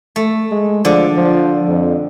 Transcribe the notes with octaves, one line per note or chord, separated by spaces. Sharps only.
A3
G#3
D3 F3 D5
F3
F2